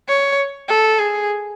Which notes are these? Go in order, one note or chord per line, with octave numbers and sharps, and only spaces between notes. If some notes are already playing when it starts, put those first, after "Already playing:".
C#5
A4
G#4